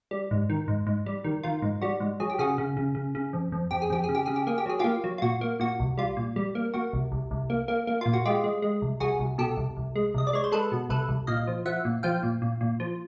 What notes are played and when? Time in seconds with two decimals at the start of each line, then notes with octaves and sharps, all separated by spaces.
0.11 G3
0.31 G#2
0.50 D#3
0.68 G#2
0.87 G#2
1.06 G3
1.24 D#3
1.43 D#3 F4
1.62 G#2
1.81 G3 F#4
2.00 G#2
2.20 F#3 G#4
2.30 G4
2.39 C#3 F#4 G#4
2.58 C#3
2.77 C#3
2.95 C#3
3.15 C#3
3.33 F2
3.52 F2
3.71 F2 G4
3.82 G#4
3.90 F2 G4
4.04 G#4
4.09 C#3
4.15 G4
4.26 C#3 G#4
4.36 G4
4.47 A#3 G#4
4.58 G4
4.66 F#3 G#4
4.79 A#3 F4 G4
5.04 F#3
5.18 F4
5.22 A#2 F#4
5.41 A#3
5.60 A#2 F#4
5.80 C2
5.98 G3 F4
6.17 A#2
6.36 G3
6.55 A#3
6.74 A#3 F#4
6.93 C2
7.12 C2
7.31 C2
7.50 A#3
7.68 A#3
7.87 A#3
8.01 A#2 F4
8.13 F#4
8.25 G#3 F4 G4
8.44 G#3
8.62 G#3
8.82 C2
9.00 C2 F#4 G#4
9.19 C2
9.38 B2 G4 A4
9.57 C2
9.77 C2
9.96 G#3
10.14 C2 D#5
10.27 D5
10.33 G#3 C#5
10.44 C5
10.52 G#3 A4 B4
10.72 B2
10.89 C2 A4 B4
11.08 C2
11.27 A#2 D#5 F5
11.47 F3
11.65 F3 E5 F#5
11.85 A#2
12.03 F3 F5 G5
12.23 A#2
12.42 A#2
12.61 A#2
12.80 F3